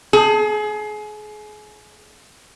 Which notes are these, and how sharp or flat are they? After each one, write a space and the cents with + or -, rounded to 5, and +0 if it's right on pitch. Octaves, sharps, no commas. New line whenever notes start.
G#4 +30